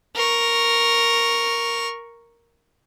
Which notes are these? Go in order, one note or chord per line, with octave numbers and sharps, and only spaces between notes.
A#4 C#6